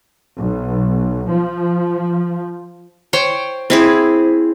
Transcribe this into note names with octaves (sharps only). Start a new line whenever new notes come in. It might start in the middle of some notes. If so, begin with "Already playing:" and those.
B1
F3
C5 C#5 G5
C4 E4 G#4